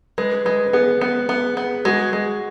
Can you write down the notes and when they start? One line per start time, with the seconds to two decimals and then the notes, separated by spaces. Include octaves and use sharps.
0.18 G#3 B4
0.45 G#3 B4
0.66 B4
0.73 B3 G#4
1.01 B3
1.29 B3
1.57 B3
1.85 G#3 F#4
2.13 G#3